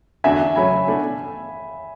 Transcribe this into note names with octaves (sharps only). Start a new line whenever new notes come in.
E2 D3 A3 D4 F#4 E5 G#5
C#3 F#3 A3 C#4 G#5 B5
B2 A3 D4